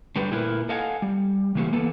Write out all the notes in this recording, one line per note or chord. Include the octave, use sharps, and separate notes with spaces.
D3 F#3 G3 G4 B4
A#2 A3 E4 A#4 B4
A4 D#5 F5 F#5 G#5
G3
C#3 E3 A3 A#3 F#4 G4
E3 A#3 B3 A4 B4